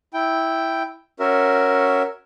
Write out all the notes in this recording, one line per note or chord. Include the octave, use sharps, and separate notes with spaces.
E4 G5
C#4 F#4 A#4 E5